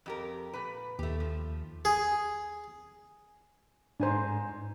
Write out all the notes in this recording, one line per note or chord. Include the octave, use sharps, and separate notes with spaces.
F2 G4 A#4
A#2 B4
D#2 A3 G4
F3
G#4
G#2 D4 C5 G#5 A#5